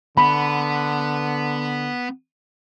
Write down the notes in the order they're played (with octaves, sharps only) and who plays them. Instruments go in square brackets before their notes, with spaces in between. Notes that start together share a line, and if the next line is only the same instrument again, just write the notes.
[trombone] D3 [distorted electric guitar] B3 [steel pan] B5